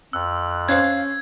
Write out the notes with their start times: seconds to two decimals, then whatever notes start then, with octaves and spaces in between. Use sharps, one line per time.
0.13 F2 E6 F#6
0.69 C#4 C5 F5 G#6